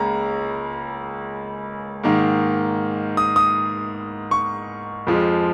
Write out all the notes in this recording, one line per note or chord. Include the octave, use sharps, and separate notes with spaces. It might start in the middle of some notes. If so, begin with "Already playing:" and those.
Already playing: C#2 C#3 A#3 A#5
G#2 D#3 A#3
D#6
D#6
C#6
F2 F3 G#3